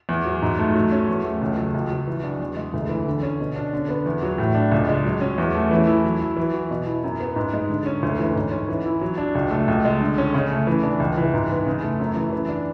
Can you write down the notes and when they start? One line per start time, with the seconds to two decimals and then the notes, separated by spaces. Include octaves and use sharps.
0.09 E2
0.26 F#3
0.42 G#2
0.58 A3
0.75 F#3
0.92 C#4
1.08 E2
1.24 A3
1.42 C#2
1.58 F#3
1.74 C#2
1.90 F#3
2.08 E3
2.24 D4
2.40 E2
2.57 G#3
2.74 D2
2.89 E3
3.07 D3
3.23 C#4
3.40 B2
3.56 D4
3.73 D3
3.89 B3
4.06 E2
4.23 F#3
4.38 A2
4.55 D4
4.72 C#2
4.89 G#3
5.05 F#3
5.21 C#4
5.38 E2
5.55 A3
5.71 E3
5.87 E4
6.04 F#3
6.20 E4
6.37 E3
6.54 F#4
6.71 B2
6.87 E4
7.04 F#2
7.20 B3
7.36 G#2
7.53 G#3
7.70 D3
7.86 C#4
8.03 D2
8.18 E3
8.35 G#2
8.51 C#4
8.68 E3
8.85 E4
9.01 F#3
9.18 D4
9.35 C#2
9.51 A3
9.68 C#2
9.85 G#3
10.01 D3
10.18 C#4
10.34 C#3
10.51 A3
10.67 E3
10.83 D4
11.00 C#2
11.17 E3
11.34 G#2
11.50 B3
11.66 C#3
11.82 A3
12.00 F#2
12.15 E3
12.33 E3
12.49 D4